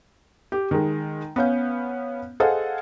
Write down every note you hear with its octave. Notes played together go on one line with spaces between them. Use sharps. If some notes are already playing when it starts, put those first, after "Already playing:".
G4
D#3 G#3
B3 C#4 F5 G6
G#4 A4 C5 D#5 F5 F#5